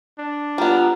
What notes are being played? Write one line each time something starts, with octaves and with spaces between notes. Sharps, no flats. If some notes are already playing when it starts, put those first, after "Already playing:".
D4
G3 B3 F4 A#5